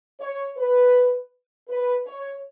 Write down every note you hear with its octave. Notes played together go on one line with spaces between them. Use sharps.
C#5
B4
B4
C#5